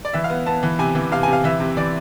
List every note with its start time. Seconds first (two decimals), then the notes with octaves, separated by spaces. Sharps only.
0.05 D5
0.13 E3 E5
0.24 F5
0.30 B3
0.46 B3 A5
0.63 E3
0.79 C3 G#5
0.95 E3
1.12 C3 F5
1.23 C3 G#5
1.33 F5
1.44 E3 E5
1.60 C3
1.77 E3 D5